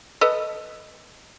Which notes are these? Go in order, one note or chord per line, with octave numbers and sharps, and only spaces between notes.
A4 B4 D#5